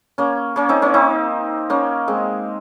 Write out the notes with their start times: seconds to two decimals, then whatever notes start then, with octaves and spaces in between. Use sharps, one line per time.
0.18 A#3 C#4
0.56 A#3 C#4
0.69 C4 D#4
0.82 A#3 C#4
0.94 C4 D#4
1.70 A#3 C#4
2.08 G#3 C4